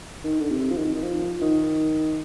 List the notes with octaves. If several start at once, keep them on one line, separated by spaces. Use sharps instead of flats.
D#3
D3
C3
F3
D#3
D#3
F3
D#3